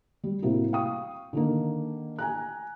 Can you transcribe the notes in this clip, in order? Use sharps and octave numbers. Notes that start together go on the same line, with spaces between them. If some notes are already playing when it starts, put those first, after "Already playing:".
G3
A2 C3 A#3 E4 F#4
F5 G5 C#6 D#6
D3 D#3 A#3
G#5 A#5 F#6